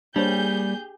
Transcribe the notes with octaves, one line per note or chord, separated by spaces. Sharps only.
G3 A#3 D4 G4 G#4 C5 C#5 G6